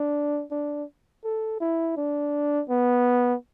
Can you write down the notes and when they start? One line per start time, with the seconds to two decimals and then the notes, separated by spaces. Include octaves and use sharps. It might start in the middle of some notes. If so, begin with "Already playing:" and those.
Already playing: D4
0.51 D4
1.24 A4
1.60 E4
1.97 D4
2.69 B3